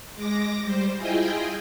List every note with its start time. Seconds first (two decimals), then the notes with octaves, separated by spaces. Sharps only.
0.15 G#3 D6 A#6
0.63 G3 C5
0.96 E4 F4 G#4 D#5 G5 G#5